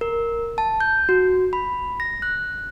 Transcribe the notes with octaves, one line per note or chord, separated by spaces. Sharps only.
A#4
A5
G6
F#4
B5
A#6
F#6